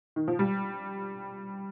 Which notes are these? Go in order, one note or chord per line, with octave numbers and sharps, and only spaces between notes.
D#3
F3
G3